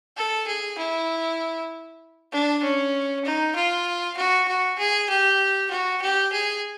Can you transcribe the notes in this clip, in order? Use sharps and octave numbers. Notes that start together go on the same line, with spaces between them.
A4
G#4
E4
D4
C#4
D#4
F4
F#4
F#4
G#4
G4
F#4
G4
G#4